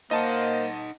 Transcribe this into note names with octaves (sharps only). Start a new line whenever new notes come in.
A#3 D#4 C5 D#5 F#5 A5